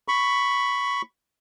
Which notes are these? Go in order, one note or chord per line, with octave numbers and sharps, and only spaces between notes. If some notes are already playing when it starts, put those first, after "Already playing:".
B5 C#6